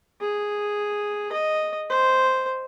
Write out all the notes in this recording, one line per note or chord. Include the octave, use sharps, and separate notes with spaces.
G#4
D#5
C5